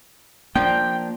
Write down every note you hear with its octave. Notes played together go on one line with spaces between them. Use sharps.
F3 A#3 D4 G5